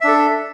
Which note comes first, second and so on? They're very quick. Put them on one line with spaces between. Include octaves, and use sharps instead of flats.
E5 D4 A4